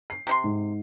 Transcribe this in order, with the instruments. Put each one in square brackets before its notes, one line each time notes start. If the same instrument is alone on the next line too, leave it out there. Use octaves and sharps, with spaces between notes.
[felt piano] C7
[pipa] C3 D#4 C6
[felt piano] G#2